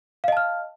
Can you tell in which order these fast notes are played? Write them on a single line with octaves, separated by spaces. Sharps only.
F5 D#5 A5 F6